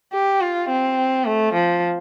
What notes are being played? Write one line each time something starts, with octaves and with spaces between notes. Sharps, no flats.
G4
F4
C4
A3
F3